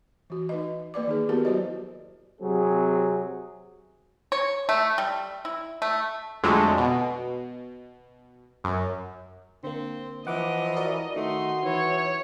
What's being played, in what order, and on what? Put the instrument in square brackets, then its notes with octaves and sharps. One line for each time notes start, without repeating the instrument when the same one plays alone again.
[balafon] E3 F#4
D#4 B4 D#5
A#3 B4 D5 D6
D#3 D#4 G#4
B3 E4 F#4 G4 A#4 B4
F#3 F#4 C5 D5 D#5
[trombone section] C3 F#3 C4 G#4
[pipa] C#5
A3
G3
E4
A3
[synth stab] F2 D3 F#3 G#3 A3
B2
F#2
[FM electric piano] D3 A#3 [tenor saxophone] C4
[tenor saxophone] E3 [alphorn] F3 [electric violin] D#5 [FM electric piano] F#5 D6
[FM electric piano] F#4 A#4 D5
[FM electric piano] D#3 [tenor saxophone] A3 [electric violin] D#4 C6 [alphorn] F#4
[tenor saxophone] E3 [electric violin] C#5